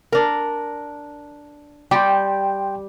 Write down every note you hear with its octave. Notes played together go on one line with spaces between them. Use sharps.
D4 A#4
G3 G4 G5 C6